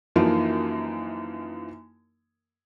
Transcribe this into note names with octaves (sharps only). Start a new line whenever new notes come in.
F#2 E3 F3 A#3 D#4